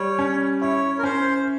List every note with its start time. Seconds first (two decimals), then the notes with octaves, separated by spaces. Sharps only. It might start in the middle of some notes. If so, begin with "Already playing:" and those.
Already playing: G3 C#5
0.19 C#4
0.61 E4 C#5
0.98 A#4
1.03 C#4 C5